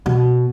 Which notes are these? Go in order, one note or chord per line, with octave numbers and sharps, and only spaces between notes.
B2